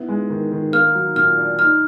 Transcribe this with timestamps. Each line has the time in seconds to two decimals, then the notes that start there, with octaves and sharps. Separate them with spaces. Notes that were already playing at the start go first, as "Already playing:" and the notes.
Already playing: B3 E4
0.08 G#3
0.30 D#3
0.52 D#3
0.73 A#3 F6
0.95 F#3
1.16 A#2 F6
1.38 D4
1.59 D#4 F6